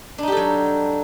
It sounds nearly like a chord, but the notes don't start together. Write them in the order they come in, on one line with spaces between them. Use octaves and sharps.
D4 D#4 G4 A4 F#3